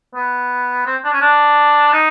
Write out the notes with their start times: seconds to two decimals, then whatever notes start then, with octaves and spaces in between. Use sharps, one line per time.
0.15 B3
0.86 C4
1.05 D4
1.13 C#4
1.22 D4
1.93 D#4